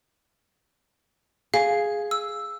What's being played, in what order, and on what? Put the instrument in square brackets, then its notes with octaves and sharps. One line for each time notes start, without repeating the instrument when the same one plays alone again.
[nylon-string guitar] G#4 [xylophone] F5
[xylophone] E6